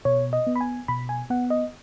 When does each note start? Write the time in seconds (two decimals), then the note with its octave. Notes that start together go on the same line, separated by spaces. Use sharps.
0.05 B2 C#5
0.33 D#5
0.47 B3
0.56 B5
0.61 G#5
0.88 B2 B5
1.09 G#5
1.30 B3 F#5
1.50 D#5